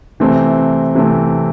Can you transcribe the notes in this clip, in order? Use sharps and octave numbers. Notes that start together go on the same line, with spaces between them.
C3 E3 A3 C4
C3 E3 A3 C4